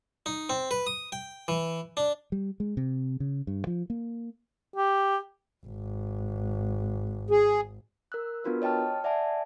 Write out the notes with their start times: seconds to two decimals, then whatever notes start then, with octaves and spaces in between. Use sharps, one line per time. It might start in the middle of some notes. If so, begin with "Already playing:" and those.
0.26 D#4
0.49 C4
0.71 B4
0.87 D#6
1.12 G5
1.48 E3
1.97 D4
2.32 G3
2.60 G#3
2.77 C3
3.20 C#3
3.47 G2
3.67 F3
3.90 A#3
4.76 G4
5.66 G#1
7.30 G#4
8.12 A#4 E6 F#6
8.44 B3 D4 F4 F#4 A#4 B4
8.62 C#5 D#5 G5 A5 F6
9.04 D5 E5 F#5 G#5 A5